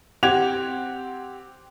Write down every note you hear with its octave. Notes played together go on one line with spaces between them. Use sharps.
C4 G4 F#5 F#6 G#6 F7